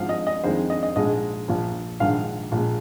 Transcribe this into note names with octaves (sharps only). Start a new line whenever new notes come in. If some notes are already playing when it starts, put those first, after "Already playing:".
Already playing: G#1 G#2 F3 F5
D#5
D#5
F2 D#3 G#3 C5
D#5
D#5
A#1 G#2 G#3 D#5
A#1 A#2 F3
A#1 G#2 D#3 F5
A#1 A#2 G#3